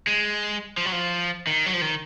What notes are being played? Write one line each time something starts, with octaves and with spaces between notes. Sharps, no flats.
G#3
F3
F#3
F3
D#3
F#3
F3
D#3